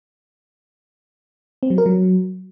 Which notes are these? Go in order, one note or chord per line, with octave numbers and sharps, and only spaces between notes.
C4
F#3
A#4
F#3